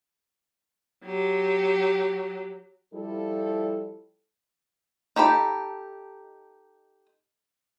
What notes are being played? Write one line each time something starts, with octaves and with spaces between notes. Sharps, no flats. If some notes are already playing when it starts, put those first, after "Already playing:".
F#3 G4
F3 G3 E4 F4 A4
D#4 G4 A4 B5